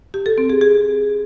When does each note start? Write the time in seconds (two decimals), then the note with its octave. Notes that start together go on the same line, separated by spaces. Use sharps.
0.14 G4
0.26 A4
0.38 C4
0.49 G#4
0.61 G#4